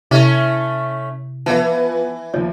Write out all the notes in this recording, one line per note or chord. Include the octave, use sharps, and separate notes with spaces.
C3 A3 C#4 E4 E5
E3 F3 B3 B4 F5 A5
D#2 F3 C#5